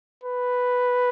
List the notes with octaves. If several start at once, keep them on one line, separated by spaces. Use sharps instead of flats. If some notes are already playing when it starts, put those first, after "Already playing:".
B4